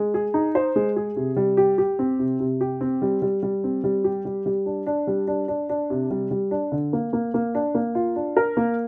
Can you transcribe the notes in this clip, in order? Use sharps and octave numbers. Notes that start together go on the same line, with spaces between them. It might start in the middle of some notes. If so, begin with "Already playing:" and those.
Already playing: G#3
G#4
D#4
C5
G#3
G#4
C3
G3
G4
G4
C4
C3
C3
G4
C4
G3
G3
G3
C4
G3
G4
G3
G3
D4
D4
G3
D4
D4
D4
C3
G3
G3
D4
D3
A#3
A#3
A#3
D4
A#3
F4
D4
A#4
A#3